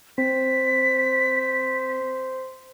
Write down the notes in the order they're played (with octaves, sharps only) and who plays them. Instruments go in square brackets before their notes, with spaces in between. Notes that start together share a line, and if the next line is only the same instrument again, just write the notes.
[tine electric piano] C4 [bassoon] C5 [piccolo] B6